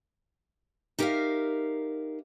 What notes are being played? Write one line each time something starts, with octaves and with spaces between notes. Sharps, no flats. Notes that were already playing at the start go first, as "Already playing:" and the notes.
D#4 G4 A#4 D5 E5 F5